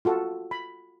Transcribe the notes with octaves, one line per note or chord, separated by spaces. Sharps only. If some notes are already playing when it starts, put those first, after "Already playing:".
F4 F#4 A4
B5